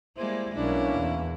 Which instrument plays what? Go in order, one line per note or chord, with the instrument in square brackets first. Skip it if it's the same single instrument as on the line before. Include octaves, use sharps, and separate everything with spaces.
[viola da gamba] G3 G#3 A#3 [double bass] E4 [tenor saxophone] C5
[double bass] B1 [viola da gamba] B2 E4 [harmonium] A#3 C#4 [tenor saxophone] D4
[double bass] E2